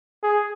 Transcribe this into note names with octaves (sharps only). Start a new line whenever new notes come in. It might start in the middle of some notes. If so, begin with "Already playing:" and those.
G#4